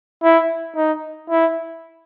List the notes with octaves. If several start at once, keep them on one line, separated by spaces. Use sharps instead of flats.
E4
D#4
E4